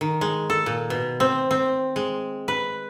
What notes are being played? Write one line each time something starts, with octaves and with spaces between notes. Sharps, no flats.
D#3
G#3
A4
A#2
B2
C4
C4
G#3
B4